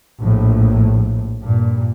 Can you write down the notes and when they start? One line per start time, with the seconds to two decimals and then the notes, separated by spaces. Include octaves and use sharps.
0.20 A#1 A2
1.42 G2 A#2